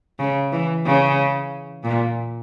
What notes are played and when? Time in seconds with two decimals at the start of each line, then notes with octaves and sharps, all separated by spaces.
0.19 C#3
0.52 E3
0.86 C#3
1.84 A#2